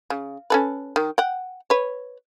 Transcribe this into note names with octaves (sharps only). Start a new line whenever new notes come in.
C#3
C#4 A4 B4
D#3
F#5 G5
B4 C#5